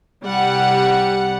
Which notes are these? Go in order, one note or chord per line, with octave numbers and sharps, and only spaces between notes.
C2 G3 F#5